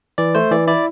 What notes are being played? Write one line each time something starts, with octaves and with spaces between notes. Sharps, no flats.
E3 D5
A3 C5
E3 D5
E4 D5